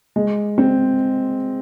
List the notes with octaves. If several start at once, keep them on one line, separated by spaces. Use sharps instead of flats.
G#3
C4